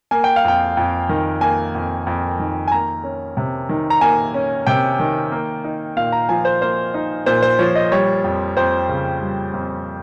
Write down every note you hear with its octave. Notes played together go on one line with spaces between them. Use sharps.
A#3 G#5
G5
F5
F2 G5
F2
D#3
A#3 G#5
F2
F2
D#3
G#5
A#3 A#5
C#4
C3
D#3
A#5
A#3 G#5
C#4
C3 G5
D#3
A#3
D#4
A#2 F5
A#5
F3 G#5
C5
A#3 C5
D#4
A#2 C5
C5
F3 C#5
D#5
G3 C#5
F2
F2 C5
C#3
G3
F2